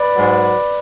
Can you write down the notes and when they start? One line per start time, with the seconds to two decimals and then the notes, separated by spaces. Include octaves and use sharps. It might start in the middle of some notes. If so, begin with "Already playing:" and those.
Already playing: B4 D5
0.15 G#2 F#3